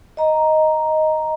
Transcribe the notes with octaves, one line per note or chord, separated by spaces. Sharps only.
D#5 A#5